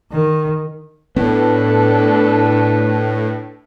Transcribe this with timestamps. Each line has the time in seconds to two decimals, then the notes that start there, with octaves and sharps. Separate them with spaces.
0.12 D#3
1.16 A2 B3 D4 A4 B4